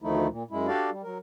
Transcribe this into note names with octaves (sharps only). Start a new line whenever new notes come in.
D2 D#3 F3 A3 D#4 E4
A#2
F#2 G#3 E4
D4 F#4 G4 A4 D5 F5
G3
F#3 A#4